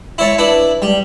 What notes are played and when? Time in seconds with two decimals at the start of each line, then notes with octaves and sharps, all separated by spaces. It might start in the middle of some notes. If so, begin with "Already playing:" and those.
0.18 E4 C#5 A5
0.38 D4 E4 B4
0.82 G3